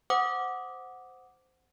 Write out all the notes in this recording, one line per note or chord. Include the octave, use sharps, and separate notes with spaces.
C5 F#5 D6 D#6